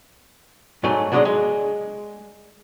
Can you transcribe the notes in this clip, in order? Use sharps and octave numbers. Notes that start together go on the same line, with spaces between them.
G#2 F#3 A3 A4 G#5 A#5
D3 F#3 G#3 D4 D#5
G#3